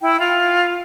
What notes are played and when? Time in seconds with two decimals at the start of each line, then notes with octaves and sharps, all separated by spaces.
0.01 E4 G5
0.20 F4